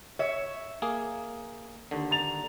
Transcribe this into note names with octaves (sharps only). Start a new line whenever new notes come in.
C#5 E5
A#3 G#4
D#2 D3
A#5 A6 F7